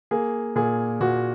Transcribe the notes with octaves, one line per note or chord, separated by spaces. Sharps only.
A#3 G#4
A#2 G#4
A#2 F#4